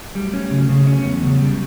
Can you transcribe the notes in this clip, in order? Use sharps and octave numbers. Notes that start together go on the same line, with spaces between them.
F#3 G3 A3
C#4
C#3
C#3
G3 B3 C#4
E2
C#3
G3